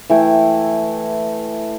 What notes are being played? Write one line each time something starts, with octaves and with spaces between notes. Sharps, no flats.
E3 A3 E4 G5